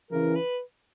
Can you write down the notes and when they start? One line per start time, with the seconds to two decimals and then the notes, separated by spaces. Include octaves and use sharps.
0.11 C#3 E3 A#4
0.35 B4